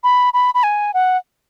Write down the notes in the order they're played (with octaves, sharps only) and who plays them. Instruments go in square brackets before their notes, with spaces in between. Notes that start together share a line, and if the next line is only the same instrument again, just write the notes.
[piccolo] B5
B5
B5
G#5
F#5